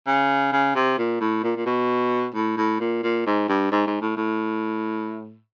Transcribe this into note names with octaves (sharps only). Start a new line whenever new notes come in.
C#3
C#3
C3
A#2
A2
A#2
A#2
B2
A2
A2
A#2
A#2
G#2
G2
G#2
G#2
A2
A2